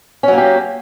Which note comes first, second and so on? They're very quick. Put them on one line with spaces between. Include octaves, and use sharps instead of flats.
C#4 F#3 A#3 G4